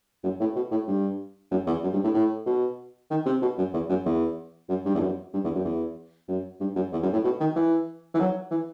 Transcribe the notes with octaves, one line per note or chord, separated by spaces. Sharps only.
F#2
A2
B2
A2
G2
F#2
E2
F#2
G2
A2
A2
B2
D#3
C3
B2
F#2
E2
F#2
E2
F#2
G2
E2
F#2
G2
E2
F#2
E2
F#2
G2
F#2
E2
F#2
A2
B2
D#3
E3
E3
F#3
E3